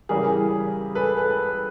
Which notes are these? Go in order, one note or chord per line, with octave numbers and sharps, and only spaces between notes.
C#3 E3 G3 G#4 A#4
A4 B4
A4 B4